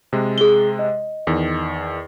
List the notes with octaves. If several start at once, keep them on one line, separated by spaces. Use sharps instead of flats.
C3 G#3
G#4 G7
D#5
E2 D#3